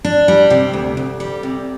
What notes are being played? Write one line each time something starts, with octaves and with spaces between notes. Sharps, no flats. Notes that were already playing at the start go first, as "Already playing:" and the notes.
D4
G3
C3
D2
D2
G3
C3